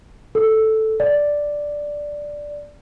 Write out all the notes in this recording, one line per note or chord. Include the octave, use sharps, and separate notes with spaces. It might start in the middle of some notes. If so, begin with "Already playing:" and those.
A4
D5